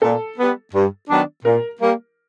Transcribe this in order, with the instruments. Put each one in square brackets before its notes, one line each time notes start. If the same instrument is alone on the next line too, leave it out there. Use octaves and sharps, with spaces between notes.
[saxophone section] A#2 [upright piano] A4
[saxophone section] G3 B3
G2
D#3 F#3 B3 D4
[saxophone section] A#2 [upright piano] A#4
[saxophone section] G3 A#3